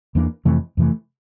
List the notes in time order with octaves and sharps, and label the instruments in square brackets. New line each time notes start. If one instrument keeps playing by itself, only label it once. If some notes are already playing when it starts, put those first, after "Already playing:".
[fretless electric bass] E2 E3 A#3 D4
F2 C3 E3 A3
F2 C3 E3 A3